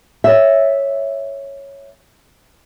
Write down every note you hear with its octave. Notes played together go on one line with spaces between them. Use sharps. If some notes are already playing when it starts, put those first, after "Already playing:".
C#5 E5